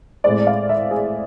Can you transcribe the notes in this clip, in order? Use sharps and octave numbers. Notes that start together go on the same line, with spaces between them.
A2 G#3 C4 D5
F5
E5
G#4